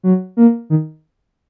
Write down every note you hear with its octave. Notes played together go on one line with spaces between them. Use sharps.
F#3
A#3
D#3